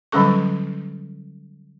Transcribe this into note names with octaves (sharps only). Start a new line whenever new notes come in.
D3 F#3 G3 C#4 A4 C#6